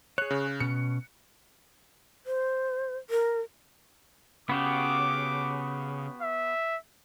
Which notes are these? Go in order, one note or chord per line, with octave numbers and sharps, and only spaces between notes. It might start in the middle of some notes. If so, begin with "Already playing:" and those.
G#4 C#5 F#6
C#3
B2 C#4 C#7
C5
A#4
C#3 B3 F#4 G4 D6
E5